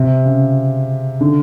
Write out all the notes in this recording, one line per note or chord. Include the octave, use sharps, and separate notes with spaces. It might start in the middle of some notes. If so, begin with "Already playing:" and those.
Already playing: C3
C#3
D3